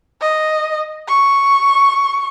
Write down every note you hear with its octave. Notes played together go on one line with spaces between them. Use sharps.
D#5
C#6